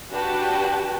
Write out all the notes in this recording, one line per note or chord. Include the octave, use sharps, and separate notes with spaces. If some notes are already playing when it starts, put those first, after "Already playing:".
D4 F#4 G4 B4 G5 A5